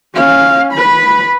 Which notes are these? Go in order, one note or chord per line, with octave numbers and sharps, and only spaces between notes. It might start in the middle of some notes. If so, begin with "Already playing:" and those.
C#4 F5
B4 B5